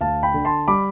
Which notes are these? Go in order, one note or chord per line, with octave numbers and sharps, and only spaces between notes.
D2 F5 A5
G5 B5
D3
A5 C6
G3 B5 D6